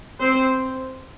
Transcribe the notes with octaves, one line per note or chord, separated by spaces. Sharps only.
C4 C5